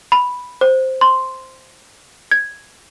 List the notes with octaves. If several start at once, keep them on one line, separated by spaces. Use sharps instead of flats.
B5
C5
C6
G#6